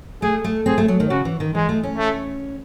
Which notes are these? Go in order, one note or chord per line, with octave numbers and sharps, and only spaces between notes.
A3 G#4
A3
C4 G#4
A3
F#3
D#3
C#3 F#4
E3
D#3
E3 G#3
A3
C#4
A3